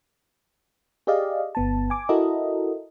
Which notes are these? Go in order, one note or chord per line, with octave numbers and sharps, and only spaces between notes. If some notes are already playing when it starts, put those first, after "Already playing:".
G4 G#4 D5 D#5 F5
G1 B3 A5
G#5 D6
E4 F#4 A4 A#4 D#5